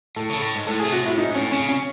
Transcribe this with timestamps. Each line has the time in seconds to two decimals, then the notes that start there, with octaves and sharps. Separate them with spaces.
0.16 A2 A4
0.29 C#3 A4
0.42 A2
0.55 G#2
0.67 A2 A4
0.80 G#4
0.84 C3
0.92 F#4
1.01 A2 E4
1.18 G#2 D#4
1.35 A2 C#4
1.51 C#3 C#4
1.69 C#4